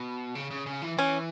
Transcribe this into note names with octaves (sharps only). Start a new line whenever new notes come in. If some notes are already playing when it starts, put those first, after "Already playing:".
Already playing: B2
C#3
C#3
C#3
E3
E3 C#4